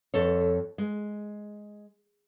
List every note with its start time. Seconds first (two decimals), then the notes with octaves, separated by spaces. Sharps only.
0.14 F2 A4 C#5
0.78 G#3